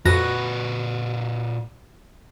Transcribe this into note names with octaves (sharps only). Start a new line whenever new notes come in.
F2 A#2 F#4 B4 A#6